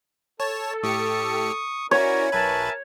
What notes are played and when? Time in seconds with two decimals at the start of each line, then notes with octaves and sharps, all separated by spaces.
0.40 A4 C#5 A5
0.83 A2 G4 C#6 D#6 C#7
1.91 C#4 E4 F#4 A#4 C#5 D5 G#5
2.32 B1 A#4 B4 E5 G#5 A5